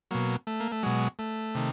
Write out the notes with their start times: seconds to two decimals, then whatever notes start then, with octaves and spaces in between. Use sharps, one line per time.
0.11 B2 F#3 A#3
0.47 A3
0.60 A#3
0.72 A3
0.83 B2 F#3 G#3
1.19 A3
1.55 C3 D#3